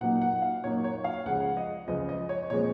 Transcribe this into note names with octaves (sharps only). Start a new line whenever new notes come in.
A#2 F#3 A#3 D#4 F#5
F#5
F5
A#2 F#3 A#3 D#4 C#5
C#5
F5
C#2 C#3 F3 G#3 F#5
D#5
C#2 C#3 F3 G#3 D#5
D#5
C#5
A#2 F3 G#3 C4 C#5